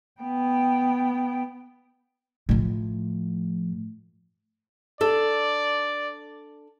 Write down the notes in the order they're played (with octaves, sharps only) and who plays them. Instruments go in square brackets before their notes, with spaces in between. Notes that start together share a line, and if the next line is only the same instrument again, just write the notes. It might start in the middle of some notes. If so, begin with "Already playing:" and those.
[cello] B3 G5
[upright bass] A2 F3
[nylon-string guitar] D4 A4 [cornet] D5